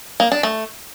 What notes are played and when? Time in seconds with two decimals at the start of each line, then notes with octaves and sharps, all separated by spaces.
0.20 A#3
0.32 D4
0.43 A3